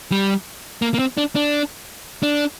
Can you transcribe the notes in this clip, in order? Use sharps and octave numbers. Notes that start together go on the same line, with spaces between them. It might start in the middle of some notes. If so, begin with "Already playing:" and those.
G3
A#3
A#3
C4
D4
D4
D4